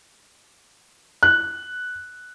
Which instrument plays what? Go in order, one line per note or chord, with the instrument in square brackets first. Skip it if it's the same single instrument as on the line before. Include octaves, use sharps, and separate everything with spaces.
[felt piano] F#6